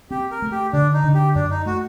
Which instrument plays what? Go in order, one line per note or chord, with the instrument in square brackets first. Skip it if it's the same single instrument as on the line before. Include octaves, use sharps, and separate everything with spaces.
[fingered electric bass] C4 [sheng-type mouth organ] G4
[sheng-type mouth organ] A#4
[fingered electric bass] A3
[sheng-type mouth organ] G4
[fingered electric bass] D3 [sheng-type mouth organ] D4
[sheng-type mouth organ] D#4
[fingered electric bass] D3
[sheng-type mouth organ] G4
[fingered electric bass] F#2 [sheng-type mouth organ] D4
[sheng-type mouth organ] D#4
[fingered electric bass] A3 [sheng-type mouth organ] F#4